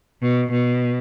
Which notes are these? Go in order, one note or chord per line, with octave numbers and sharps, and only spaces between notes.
B2
B2